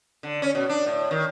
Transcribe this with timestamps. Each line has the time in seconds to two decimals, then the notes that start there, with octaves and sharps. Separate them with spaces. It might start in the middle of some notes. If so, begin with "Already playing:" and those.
0.23 D3
0.42 C#4
0.55 B2
0.69 D4
0.86 A2
1.11 D#3